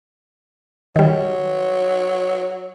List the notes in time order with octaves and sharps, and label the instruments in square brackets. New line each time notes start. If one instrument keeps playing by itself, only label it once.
[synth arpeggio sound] D#3 G3 [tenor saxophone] F#3